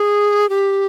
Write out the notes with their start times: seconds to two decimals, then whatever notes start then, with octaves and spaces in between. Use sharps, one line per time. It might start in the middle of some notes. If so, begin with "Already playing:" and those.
Already playing: G#4
0.49 G4